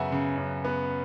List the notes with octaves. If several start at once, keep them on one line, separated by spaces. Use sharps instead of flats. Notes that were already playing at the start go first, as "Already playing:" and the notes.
Already playing: F#2 C#3 B3 E5 F#5 G#5
C#3
F#2
B3